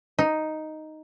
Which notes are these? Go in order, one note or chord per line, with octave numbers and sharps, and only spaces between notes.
D#4